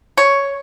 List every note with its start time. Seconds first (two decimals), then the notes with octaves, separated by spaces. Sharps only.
0.17 C#5